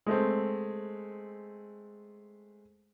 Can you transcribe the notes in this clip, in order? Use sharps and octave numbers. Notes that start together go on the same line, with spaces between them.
G#3 A3 C4